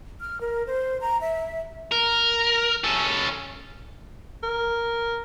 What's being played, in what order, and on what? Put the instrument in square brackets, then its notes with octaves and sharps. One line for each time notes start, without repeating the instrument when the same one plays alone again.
[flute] F6
A#4
C5
A#5
E5
[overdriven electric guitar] A#4
C#4 A4
[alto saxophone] A#4